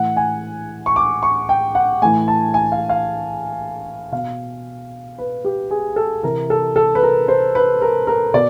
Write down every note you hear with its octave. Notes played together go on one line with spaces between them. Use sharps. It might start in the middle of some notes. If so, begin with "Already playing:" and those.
Already playing: A2 E3 F#5
G#5
C#6
D6
C#6
G5
F#5
A2 E3 G#5
A5
G#5
F5
F5
B2 F5
B4
G4
G#4
A4
C3 E3 A#4
A4
A4
B4
A#4
C5
B4
A#4
A#4
B2 D5